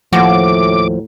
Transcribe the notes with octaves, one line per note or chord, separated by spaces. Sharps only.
D#2 A2 F3 F#4 D6